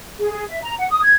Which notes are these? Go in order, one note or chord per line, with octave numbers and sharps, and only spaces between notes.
G#4
G#4
E5
A#5
F#5
D#6
G#6